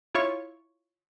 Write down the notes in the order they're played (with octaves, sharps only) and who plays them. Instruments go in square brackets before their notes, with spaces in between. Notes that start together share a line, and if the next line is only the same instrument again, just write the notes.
[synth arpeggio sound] E4 F4 C#5 C#6